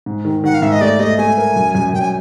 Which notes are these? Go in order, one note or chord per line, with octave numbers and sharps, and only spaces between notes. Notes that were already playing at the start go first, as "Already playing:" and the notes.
G#2
D#3
D#3 F#5
F5
G#2 E5
D#5
A3 D5
A3 D#5
A3 G#5
A#4
F#2
F#2
F#2 G5
G#5